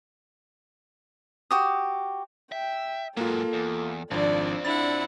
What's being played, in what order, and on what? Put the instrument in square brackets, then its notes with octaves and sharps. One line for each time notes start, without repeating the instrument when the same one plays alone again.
[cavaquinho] F#4 G4 D#6
[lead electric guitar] E5 [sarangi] G5
[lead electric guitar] G#2 F#3 [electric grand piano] A#3 F4 [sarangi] A4
[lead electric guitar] E2
[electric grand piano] G#1 F3 [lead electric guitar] C4 F4 [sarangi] D4 [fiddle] D5
[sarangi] D4 [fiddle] E4 F#5 [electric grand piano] A6